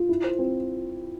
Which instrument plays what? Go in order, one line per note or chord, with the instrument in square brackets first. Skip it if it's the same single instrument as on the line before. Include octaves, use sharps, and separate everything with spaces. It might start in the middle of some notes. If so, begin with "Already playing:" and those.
Already playing: [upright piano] F4
E4
C5
C4